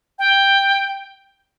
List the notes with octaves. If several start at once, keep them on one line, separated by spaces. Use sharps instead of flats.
G5